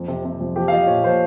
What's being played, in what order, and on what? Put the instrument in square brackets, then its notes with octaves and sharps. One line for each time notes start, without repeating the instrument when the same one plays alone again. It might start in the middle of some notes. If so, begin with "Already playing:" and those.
Already playing: [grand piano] F2
C3
C3
F2
F3 G4
F5
F3 D#5
A#2 C#5
F3 C5